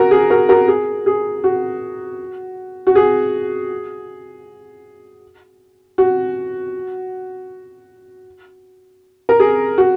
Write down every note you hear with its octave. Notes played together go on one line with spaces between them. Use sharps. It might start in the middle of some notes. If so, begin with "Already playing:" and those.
Already playing: F#4 A#4
G#4
F#4 A#4
F#4 A#4
G#4
G#4
F#4
F#4
G#4
F#4
A#4
G#4
F#4